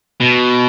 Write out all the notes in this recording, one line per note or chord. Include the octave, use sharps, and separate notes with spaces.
B2